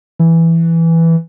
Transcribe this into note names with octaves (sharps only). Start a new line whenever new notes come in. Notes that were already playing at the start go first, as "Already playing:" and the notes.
E3